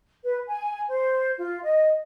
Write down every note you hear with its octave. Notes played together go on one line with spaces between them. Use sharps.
B4
G#5
C5
F4
D#5